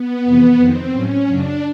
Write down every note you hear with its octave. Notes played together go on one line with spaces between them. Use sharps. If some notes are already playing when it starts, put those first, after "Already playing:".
Already playing: B3
F2 C3 E3
F2 C3 D#3 C4
A2 F#3 C#4
F#2 C#3 F#3 D4